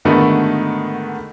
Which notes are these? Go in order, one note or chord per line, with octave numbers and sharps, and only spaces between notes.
G#2 D3 D#3 A3 B3 F#4